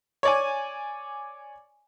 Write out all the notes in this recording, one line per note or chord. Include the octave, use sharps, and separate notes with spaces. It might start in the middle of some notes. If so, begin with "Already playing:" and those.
C#5 D5 G#5